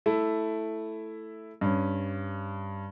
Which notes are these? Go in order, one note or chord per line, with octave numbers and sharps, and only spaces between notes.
A3 E4
G2 C#4